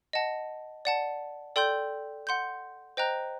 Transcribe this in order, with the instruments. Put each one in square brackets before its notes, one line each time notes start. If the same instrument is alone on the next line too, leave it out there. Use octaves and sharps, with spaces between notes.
[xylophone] D#5 F#5 A5
D5 F#5 A5
A4 D5 G5 C6 G6
F#5 C6 G6
C5 D#5 G5 A#5 F#6